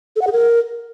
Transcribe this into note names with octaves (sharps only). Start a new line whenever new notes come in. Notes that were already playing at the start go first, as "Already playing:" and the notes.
A4
F#5
G#4
A#4